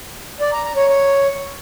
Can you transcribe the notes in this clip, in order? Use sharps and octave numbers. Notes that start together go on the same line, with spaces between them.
D5
A#5
A#5
C#5
C#5